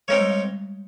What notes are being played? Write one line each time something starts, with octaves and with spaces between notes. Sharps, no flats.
G#3 C4 D#4 A#4 C#5
G3
G#3